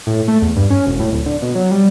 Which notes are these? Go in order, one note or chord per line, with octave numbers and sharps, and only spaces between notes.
A2
A3
E2
G2
C#4
E1
A2
D1
D3
B2
F#3
G3